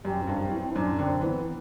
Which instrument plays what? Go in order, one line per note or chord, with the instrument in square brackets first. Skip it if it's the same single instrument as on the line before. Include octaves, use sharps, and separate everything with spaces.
[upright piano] F#2 [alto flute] G4
[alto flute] C4
[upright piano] G2
[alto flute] C4
[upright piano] A2
[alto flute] C4
E4
[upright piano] F#2 [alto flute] D4
[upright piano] D3 [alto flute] C4
[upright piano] E3 [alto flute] B3